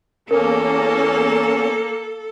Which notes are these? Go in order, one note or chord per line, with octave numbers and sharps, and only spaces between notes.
E2 A#3 C#4 A4 A#4